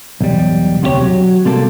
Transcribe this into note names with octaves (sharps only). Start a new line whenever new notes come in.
B1 E2 G3
D2 C3 D#4 F#4 G4 C#5
F#3
C3 G3 A#3 A4